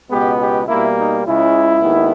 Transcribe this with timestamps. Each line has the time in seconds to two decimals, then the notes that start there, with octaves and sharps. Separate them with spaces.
0.11 C#2 B2 G#3 B3 G4
0.40 G4
0.68 B2 G3 A#3 E4
0.97 D#4
1.26 C#2 C#3 G#3 E4
1.82 D#2 D#3 G#3 B3